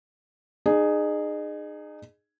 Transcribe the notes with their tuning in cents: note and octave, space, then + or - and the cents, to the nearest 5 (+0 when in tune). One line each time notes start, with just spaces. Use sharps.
D#4 -35 G#4 +0